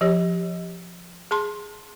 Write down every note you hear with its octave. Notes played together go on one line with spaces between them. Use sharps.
F3 G4 C#5
G#4 A5 C6